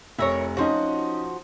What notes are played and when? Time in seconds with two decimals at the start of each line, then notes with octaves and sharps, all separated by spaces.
0.19 F1 E4 A#4 C#5
0.57 F3 C#4 D#4 F#4